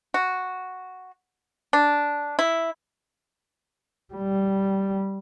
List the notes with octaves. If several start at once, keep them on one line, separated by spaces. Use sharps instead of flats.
F#4
D4
E4
G3